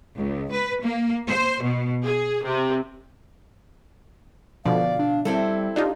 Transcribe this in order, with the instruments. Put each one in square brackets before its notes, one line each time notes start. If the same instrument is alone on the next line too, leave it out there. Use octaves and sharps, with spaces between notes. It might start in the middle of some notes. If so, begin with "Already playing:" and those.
[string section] C#2
B4
A#3
C5
B2
G#4
C3
[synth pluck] B2 D3 F3 [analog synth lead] D5 [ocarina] F5
[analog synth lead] D4
[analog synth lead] G3 [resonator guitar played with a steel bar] C4 E4 A4 [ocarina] E5
[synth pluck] D4 D#4 F4 [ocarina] G4